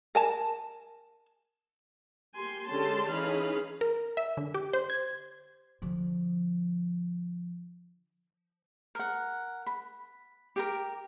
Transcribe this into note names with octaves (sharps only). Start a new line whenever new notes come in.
A#4 G#5 A5
A#3 G4 G#5 C6
D3 G#3 C#4 G4 A5 C6
E3 C#4 D#4 G#4 F5 B5
A#4
E5
D3
G4
C5
G#6
D3 F3
A#4 F#5
B5
G4 G#4 A#4